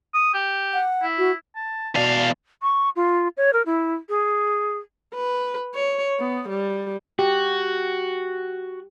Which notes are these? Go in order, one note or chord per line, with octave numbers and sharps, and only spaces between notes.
D#6
G4
F#5
E4
F#4
A5
E2 B2 D5 F5 A5 D#7
C#6
F4
C#5
A#4
E4
G#4
B4
C#5
B3
G3
F#4 G4